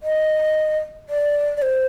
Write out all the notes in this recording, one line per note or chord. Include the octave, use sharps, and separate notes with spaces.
D#5
D5
D5
C5